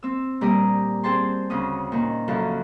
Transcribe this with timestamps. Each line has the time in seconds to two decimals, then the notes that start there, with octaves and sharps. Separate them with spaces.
0.03 C4 E6
0.41 A#2 G3 D5 A#5 D#6
1.03 C4 G#4 C5 G5 A5 C6
1.50 D2 C#3 C4 C#4 D#6
1.92 A#2 D#3
2.28 F#2 C#3 F3 A4